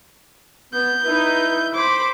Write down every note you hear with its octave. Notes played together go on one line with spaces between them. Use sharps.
B3 G6
D#4 E4 B4
C5 B5 D6